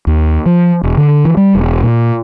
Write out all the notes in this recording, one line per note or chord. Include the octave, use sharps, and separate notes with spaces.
D#2
F3
E1
D3
E3
G3
E1
A#2